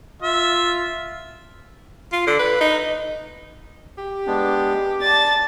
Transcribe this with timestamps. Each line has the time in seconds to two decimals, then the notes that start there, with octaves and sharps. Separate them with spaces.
0.22 F4 E5
2.12 F4
2.27 D3
2.39 B4
2.61 D#4
3.98 G4
4.27 G#3 B3 D4
5.01 D5 A5 A6